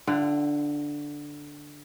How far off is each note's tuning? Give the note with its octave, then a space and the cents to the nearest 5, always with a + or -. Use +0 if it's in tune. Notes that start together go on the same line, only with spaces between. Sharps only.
D3 +0 F4 -35 F#5 +35